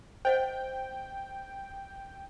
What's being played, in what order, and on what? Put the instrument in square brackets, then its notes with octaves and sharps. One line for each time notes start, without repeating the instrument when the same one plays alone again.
[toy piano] C5 D#5 F#5 [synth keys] G5